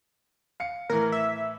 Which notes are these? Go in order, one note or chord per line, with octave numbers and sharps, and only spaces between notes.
F5 C#7
A2 E3 A#4
E5